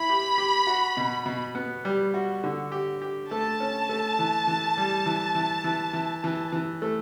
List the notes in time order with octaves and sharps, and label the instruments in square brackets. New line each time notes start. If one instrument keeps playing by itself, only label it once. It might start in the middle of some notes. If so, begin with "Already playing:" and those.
Already playing: [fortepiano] E4 [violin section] B5
[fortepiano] G4
G4
F#4
B2
B2
B3
G3
F#4
D3
G4
G4
[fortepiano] A3 [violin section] A5
[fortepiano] C#4
A3
E3
E3
G3
E3
E3
E3
E3
E3
E3
A3